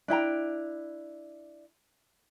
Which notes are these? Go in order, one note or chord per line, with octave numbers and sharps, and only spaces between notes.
D4 E4 G5 A#5